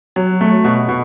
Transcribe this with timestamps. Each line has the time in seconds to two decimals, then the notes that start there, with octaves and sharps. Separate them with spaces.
0.16 F#3
0.41 A3
0.64 B2
0.89 B2